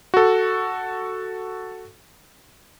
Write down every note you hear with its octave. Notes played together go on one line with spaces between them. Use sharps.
F#4 A4